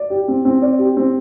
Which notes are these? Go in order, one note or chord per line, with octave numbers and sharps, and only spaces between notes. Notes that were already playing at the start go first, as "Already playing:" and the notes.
Already playing: D5
G4
C4
C4
D5
G4
C4